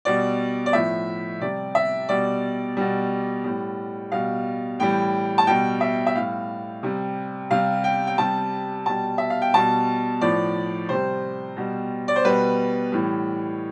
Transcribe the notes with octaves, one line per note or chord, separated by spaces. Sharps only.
B2 G3 D5
D5
A2 F3 E5
C3 G3 D5
E5
B2 G3 D5
B2 G3
A2 G3
B2 G3 F5
A2 E3 G3 G5
A5
B2 G3 G5
E5
E5
A2 G3 F5
C3 G3
C3 G3 F5
G5
G5
C3 G3 A5
B2 G3 A5
E5
F5
G5
B2 G3 A5
A2 F3 D5
C3 G3 C5
B2 G3
D5
C5
B2 G3 B4
A2 E3 G3